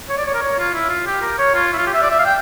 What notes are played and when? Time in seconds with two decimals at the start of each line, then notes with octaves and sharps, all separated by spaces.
0.09 C#5
0.17 D5
0.27 C#5
0.34 A#4
0.42 C#5
0.58 F4
0.74 E4
0.89 F4
1.07 G4
1.22 A#4
1.39 C#5
1.54 F4
1.73 E4
1.78 F4
1.87 G4
1.94 E5
2.02 D5
2.10 E5
2.19 F5
2.26 G5